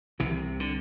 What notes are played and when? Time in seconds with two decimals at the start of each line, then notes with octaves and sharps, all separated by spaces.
0.20 C2 C3 E3
0.60 D3